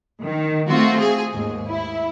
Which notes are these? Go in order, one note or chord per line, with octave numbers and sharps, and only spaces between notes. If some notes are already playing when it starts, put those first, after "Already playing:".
D#3
A3 C4 F4 F#4
G#4
D#2 G#2
E4